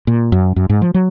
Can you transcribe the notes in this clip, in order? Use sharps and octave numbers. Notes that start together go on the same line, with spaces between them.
A#2
F#2
F#2
G#2
F3
F#3